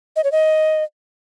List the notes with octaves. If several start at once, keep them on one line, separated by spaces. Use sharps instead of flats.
D#5
C#5
D#5